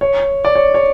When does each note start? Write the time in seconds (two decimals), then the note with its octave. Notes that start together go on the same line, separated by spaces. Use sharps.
0.01 C#5
0.45 D5
0.55 C#5
0.74 C#5